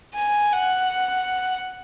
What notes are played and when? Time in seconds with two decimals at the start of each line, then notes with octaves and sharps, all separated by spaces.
0.14 G#5
0.53 F#5